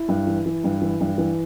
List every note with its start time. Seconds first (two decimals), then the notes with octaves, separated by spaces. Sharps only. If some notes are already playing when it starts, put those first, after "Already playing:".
Already playing: E4
0.09 G2
0.27 E3
0.46 E3
0.64 G2
0.82 E3
1.00 G2
1.18 E3